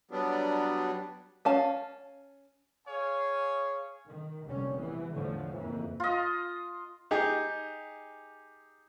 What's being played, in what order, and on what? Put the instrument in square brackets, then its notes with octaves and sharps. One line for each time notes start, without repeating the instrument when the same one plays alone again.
[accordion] F#3 G3 B3 D4
[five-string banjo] C#4 F5 A5
[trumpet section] G#4 C#5 F5 G#5
[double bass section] D#3
F1 A#2 D3 G3 C#4
E3 B3
E2 A2 D3 F3 A3
F2 C#3 E3 A#3
[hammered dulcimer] F4 D#5
[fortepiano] D#4 G4 G#4